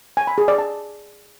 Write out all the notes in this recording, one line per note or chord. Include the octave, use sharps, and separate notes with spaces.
G#5
B5
G#4
D5
A5